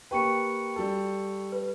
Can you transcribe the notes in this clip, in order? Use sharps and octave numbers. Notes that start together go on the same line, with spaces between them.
A#3 G4 B4 G5 C#6 C#7
G3 A4
B4